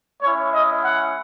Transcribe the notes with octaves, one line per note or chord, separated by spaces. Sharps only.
G#3 C#4 E4 C#5
D#5
F#5